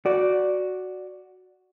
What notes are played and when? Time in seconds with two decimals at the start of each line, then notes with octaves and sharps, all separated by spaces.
0.06 F#4 D5